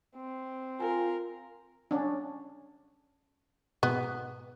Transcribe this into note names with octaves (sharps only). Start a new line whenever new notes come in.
C4
F4 A#4 G#5
C#4 D4
G#2 B2 B3